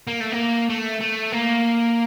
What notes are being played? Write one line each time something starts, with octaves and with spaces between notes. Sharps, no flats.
A#3
A3
A#3
A3
A3
A#3